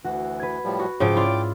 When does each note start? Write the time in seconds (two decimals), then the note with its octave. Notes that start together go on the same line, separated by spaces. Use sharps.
0.04 D2 E3 F#4
0.40 B4 G#6
0.64 A2 F3 G3
0.80 F#4
1.00 G#2 C#3 F3 G5 D6
1.16 E4 F4 D5